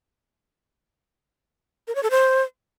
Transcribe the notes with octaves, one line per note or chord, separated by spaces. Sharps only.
A#4
C#5
A4
C5